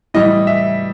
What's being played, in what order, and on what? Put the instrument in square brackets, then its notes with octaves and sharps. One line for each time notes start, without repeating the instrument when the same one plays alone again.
[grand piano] A2 E3 G3 D#5
E5